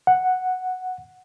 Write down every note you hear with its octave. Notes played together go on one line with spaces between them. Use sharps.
F#5